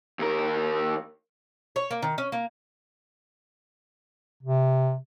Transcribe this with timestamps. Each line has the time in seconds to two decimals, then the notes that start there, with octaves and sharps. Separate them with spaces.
0.19 D#2 A#4
1.76 C#5
1.91 A#3
2.02 D#3
2.18 C#4
2.32 A#3
4.43 C3